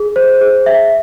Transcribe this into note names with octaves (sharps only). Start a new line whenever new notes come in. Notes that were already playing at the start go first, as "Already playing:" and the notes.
Already playing: G#4
C5
G#4
E5